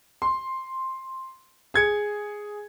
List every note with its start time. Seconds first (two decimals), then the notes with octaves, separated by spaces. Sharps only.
0.22 C6
1.74 G#4 G#6 C#7